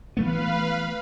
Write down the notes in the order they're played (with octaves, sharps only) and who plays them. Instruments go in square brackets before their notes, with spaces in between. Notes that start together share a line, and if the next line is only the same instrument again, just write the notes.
[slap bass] E3 A3 B3 [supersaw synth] B4 F5